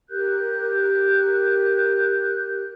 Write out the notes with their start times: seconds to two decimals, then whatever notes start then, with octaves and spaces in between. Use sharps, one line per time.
0.09 G4 A#4 F#6 G6